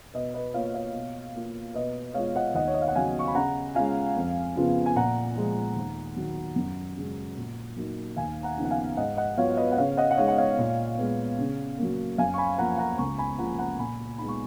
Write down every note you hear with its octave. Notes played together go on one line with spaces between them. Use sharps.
B2 B4 D#5
B4 D#5
A#3 F4 C#5 F5
C#5 F5
B2
A#3 F4
B2 B4 D#5
G#3 B3 F4 C#5 F5
D#5 F#5
D#2 D#5 F#5
C#5
D#5
F5
F#5
C#3 F#3 F5 G#5
C#6
B5
C#3 F#5 A#5
G#3 C#4 F4 F5 G#5
F2
C#3 F3 B3 F4
G#5
A#2 F#5 A#5
F3 G#3
D#2
D#3 F#3
F#2
C#3 G#3
A#2
F#3 A#3 D#4
D#2 F5 G#5
F#5 A#5
C#3 F3 B3 D#4
F#5
F5 G#5
G#2 D#5 F#5
D#5 F#5
F#3 B3 F4 C#5 F5
B4 D#5
F#5
C#3 C#5 F5
D#5 F#5
F#5
G#3 D#4 C#5 F5
F#5
C#5 F5
A#2
G#3 B3
C#3
F#3 A#3
F#2 F5 G#5
C#6
G#5 B5
F3 A#3 F#5 A#5
F#5 A#5
C#2 A#5 C#6
G#5 B5
C#3 F3 A#3 F4 F#5 A#5
F#5 A#5
A#2 G#5 B5
G#3 B3 D#4 B5
C#6